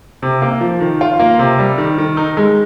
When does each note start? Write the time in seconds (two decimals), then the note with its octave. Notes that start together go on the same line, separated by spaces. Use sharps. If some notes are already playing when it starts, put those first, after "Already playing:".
0.22 C3
0.42 A#3
0.61 F3
0.80 D#3
1.01 F4
1.20 A#3
1.39 C3
1.59 G3
1.78 D#3
1.98 D#3
2.17 D#4
2.37 G#3